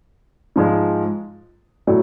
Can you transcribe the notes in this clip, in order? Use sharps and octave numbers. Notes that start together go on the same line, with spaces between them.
G#2 F3 G#3
A2 F#3